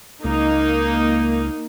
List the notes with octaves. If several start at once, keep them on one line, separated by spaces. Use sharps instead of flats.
C#2 A#3 D#4